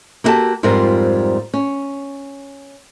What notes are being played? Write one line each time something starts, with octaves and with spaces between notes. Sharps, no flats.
A#3 E4 F#4 G4 A4 A5
F2 G#2 G3 C4 F4 A#4
C#4